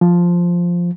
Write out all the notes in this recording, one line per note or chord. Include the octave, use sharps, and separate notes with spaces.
F3